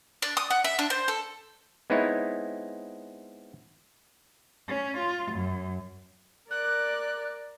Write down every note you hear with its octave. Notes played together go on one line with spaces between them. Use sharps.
D4
D#6
F#5
E5
D4
C5
A4
G#3 B3 C4 D#4 E4 C#5
C#4
F4
F#2
A#4 D5 F#6